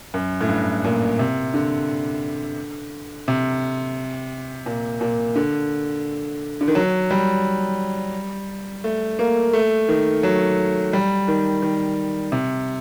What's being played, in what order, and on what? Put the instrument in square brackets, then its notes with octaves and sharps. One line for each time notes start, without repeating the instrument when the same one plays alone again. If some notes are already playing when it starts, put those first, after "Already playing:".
[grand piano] F#2
A2
G2
A#2
C3
D3
C3
A#2
A#2
D3
D3
D#3
F#3
G3
A3
A#3
A3
D#3
F#3
G3
D#3
D#3
C3